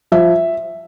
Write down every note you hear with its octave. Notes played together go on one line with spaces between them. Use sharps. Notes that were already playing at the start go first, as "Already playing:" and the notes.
F3 E5